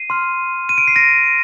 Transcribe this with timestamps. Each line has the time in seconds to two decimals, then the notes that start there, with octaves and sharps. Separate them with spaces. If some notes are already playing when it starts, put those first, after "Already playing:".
Already playing: C7 D#7
0.10 C6 F6
0.69 D#7
0.78 D7
0.88 C7
0.96 A#6 D7